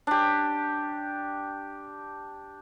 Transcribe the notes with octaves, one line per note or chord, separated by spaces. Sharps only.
D4 G4